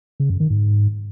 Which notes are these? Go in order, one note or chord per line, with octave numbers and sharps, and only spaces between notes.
C#3
F#2
D#3
G#2